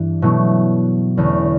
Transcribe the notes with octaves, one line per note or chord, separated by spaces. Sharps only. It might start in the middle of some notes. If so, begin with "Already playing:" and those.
Already playing: G2 E3 D4
B2 F#3 A3 E4
E2 D3 A3 C#4